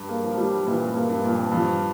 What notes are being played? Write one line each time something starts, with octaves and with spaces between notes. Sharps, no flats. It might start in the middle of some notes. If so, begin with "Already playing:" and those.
Already playing: G2
A#3
F3
G3
A#2 E3
G2
A#3
G2
A#2
F2
G2 F3